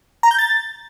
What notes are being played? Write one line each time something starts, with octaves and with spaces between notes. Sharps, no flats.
A#5
G6
A6